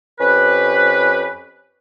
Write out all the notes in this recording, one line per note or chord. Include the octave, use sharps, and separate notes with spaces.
F2 C#4 G4 B4